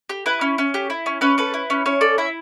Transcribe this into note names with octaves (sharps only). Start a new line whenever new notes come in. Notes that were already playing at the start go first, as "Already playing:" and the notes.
G4
E4 B4
C#4
C#4
G4
E4
C#4
C#4 B4
A4 B4
E4
C#4
C#4 C#5
A4 D5
E4 E5